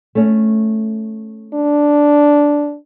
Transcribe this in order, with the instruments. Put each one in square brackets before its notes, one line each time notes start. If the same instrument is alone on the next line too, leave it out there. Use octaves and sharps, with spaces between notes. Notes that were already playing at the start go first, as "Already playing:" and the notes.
[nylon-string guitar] A3 C#4
[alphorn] D4